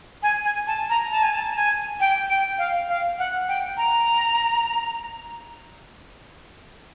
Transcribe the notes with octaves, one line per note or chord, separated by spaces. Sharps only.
G#5
G#5
A5
A#5
A5
G#5
A5
G#5
G5
G5
F5
F5
F#5
G5
A#5